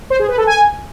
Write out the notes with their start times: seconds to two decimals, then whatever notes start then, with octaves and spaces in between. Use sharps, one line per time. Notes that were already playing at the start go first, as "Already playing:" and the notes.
0.10 C5
0.19 G#4
0.29 B4
0.38 A4
0.47 G#5